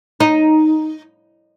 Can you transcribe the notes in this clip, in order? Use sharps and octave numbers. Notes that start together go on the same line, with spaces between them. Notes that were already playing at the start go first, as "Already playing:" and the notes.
D#4